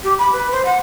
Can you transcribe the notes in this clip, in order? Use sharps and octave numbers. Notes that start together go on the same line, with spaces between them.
G4
B5
B4
C5
F#5